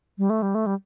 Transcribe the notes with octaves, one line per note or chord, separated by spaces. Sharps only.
G3
A3
G3
A3
G3